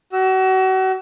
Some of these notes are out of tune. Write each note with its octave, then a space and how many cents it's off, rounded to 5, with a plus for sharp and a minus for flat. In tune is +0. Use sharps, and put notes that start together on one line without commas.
F#4 +35 E6 +0